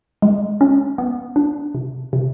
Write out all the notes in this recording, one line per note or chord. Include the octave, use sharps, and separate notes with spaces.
G#3
C#4
B3
D4
C3
C3